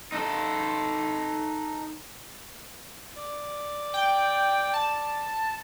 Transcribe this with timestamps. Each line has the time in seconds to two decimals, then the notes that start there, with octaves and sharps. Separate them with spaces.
0.12 D#4 A4
3.17 D5
3.94 G5
4.74 A5